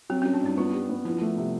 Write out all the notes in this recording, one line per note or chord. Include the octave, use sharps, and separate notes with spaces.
F#3 C4
C#4
F#3
D4
G2 D#4
B3 F4
G3
B3
F3 E4
A3
C3